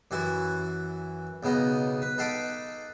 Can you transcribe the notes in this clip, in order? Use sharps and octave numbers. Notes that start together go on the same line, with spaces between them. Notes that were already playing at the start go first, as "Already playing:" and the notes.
F#2 E3 E4 F#4
B1 C#3 B3 D#4 D#5
B4
D#4 A4 F5 F#5 B5 D6